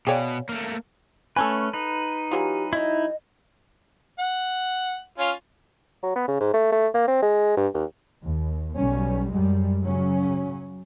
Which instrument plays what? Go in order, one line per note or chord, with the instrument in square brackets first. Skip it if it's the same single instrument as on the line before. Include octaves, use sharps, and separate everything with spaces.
[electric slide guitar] B2 [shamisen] G#4 C#5 D5 [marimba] F5 G5 G#5
[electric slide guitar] A3 A#3
[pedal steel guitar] A3 C#4 B4 [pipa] A4 G#5
[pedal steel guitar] D#4 B4
[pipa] E3 F#3 F4 [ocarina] G4
[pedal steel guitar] D#4 E4 [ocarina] D#5
[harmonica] F#5
C#4 F4
[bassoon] F#3
B3
C#3
G#2
A3
A3
A#3
C4
G#3
G2
D#2
[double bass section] D#2
B1 G3 C#4
F#2 G3 G#3
C#3 F#3 C#4